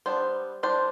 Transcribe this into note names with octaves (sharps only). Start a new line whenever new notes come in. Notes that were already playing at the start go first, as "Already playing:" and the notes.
G3 B3 D4 C5
G3 D4 C5